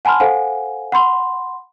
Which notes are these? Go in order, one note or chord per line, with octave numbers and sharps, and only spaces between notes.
F#5 G#5 A5 B5 C6 F6
A4 C5 F5 F#5 G#5
F#5 B5 C6